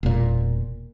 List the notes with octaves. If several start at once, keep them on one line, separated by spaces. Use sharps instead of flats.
E1 A#2